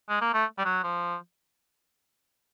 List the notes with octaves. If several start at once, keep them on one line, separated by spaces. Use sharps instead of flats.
G#3
A#3
A3
G3
F#3
F3